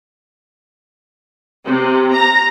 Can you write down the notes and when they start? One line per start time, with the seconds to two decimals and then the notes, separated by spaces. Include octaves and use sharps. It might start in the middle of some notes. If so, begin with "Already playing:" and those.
1.66 C3
2.13 A#5